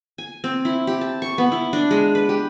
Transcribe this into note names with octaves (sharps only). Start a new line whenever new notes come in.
G#5
C4
E4
G4
A5
C#6
B3
E4
D4
G#3
B4
G4